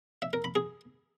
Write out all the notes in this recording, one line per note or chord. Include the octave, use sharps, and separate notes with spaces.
E5
A#4
B5
G#4